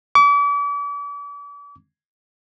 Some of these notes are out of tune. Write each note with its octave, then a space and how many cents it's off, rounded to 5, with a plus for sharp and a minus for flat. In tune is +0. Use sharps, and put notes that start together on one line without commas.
D6 -40